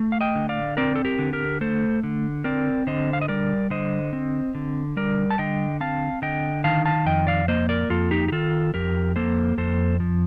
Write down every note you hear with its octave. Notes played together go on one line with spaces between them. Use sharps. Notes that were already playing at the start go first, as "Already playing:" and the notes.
Already playing: A3
F5
D#5 G5
D3
D5 F5
C4 A#4 D5
A4
G4 A#4
D3
G4 A#4
A3 A4 C5
D3
C4 A#4 D5
D3 C5 D#5
F5
D#5
G3 A#4 D5
D3 C5 D#5
C4
D3
G3 A#4 D5
A5
D3 D#5 G5
C4 F5 A5
D3 D#5 G5
D#3 F5 A5
F5 A5
F2 D#5 G5
D5 F5
A#3 C5 D#5
A#4 D5
F2 F4 A4
D#4 G4
G4
D#3 F4 A4
F2 G4 A#4
A#3 A4 C5
F2 A4 C5
F3